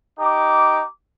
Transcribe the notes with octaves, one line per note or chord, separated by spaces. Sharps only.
D#4 G4 D6